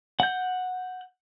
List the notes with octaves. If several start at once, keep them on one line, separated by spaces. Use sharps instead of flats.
F#5 G6